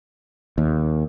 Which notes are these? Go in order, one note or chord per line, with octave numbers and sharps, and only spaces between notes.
D#2